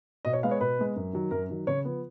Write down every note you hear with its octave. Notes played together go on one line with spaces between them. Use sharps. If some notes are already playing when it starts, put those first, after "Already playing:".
B2 D#5
C#5
G#3 B3 F5
C#5
B2 B4
G#3 B3
F#2
D#3 F#3
F#2 A#4
D#3 F#3
C#3 C#5
F3 B3